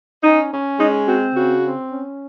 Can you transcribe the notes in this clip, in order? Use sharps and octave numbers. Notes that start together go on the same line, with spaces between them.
C#4 D#4
C#4
G#3 D#4
C4 F#4
C#3 F#4
C4
C#4